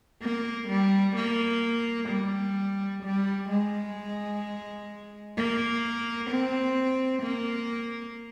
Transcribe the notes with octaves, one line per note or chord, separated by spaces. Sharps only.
A#3
G3
A#3
G3
G3
G#3
A#3
C4
A#3